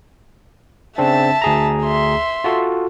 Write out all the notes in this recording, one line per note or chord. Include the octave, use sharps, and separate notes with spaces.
C#3 C4 D4 E5 A5
D2 G#4 A#5
E5 C6
F4 F#4 A4